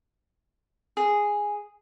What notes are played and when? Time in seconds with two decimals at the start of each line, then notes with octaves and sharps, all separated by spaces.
0.97 G#4